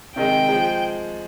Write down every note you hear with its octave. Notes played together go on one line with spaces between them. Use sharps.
C3 D#3 G#3 D#4 G5
F3 G#3